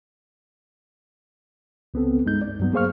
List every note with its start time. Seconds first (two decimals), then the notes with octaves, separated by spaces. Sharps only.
1.94 C#2 B3 C4 A4
2.25 G2 G#3 D#4 G6
2.42 D5
2.60 G2 F#3 B3
2.73 A#3 G#4 C5 F5 C#6 F6